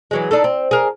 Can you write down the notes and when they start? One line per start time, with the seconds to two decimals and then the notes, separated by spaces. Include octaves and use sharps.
0.11 E3 F#3 G#3
0.31 D4 D#4 A4
0.44 C4
0.71 G#4 A#4